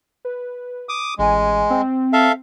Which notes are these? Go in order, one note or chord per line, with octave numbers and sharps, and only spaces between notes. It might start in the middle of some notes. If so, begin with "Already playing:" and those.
B4
D6 D#6
A1 G#3 G#5
C4
A4 E5 F5